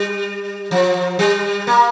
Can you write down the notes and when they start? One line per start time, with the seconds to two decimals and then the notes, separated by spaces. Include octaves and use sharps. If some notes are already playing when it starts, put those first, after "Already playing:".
Already playing: G3
0.71 F3
1.19 G3
1.67 A#3